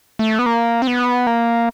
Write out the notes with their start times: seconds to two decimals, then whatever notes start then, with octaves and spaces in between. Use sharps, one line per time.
0.19 A3
0.39 B3
0.46 A#3
0.82 C4
0.87 B3
1.27 A#3